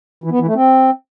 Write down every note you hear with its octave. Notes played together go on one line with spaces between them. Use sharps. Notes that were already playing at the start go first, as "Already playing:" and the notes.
E3
B3
E3
A3
C4